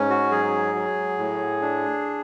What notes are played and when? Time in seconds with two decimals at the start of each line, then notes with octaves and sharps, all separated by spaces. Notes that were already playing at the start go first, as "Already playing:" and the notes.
Already playing: G#2 C#4
0.10 F#4
0.31 F#3 G#4
0.75 F#3
1.18 A2
1.61 D4